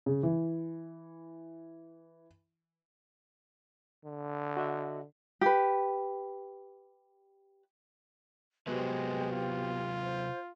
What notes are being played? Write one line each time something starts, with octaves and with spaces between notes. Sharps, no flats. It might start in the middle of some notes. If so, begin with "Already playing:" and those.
C#3
E3
D3
F#4 D#5 E5
G4 B4
C3 F#3 G#3 B3 F#4 G4 B4 C5
F4
C5